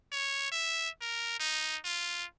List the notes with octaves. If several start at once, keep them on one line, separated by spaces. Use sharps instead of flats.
C#5
E5
A#4
D#4
F4